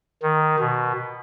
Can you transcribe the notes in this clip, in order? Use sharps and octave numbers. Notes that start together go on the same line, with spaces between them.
D#3
B2